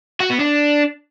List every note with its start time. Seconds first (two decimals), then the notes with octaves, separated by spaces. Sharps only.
0.20 F#4
0.30 B3
0.39 D4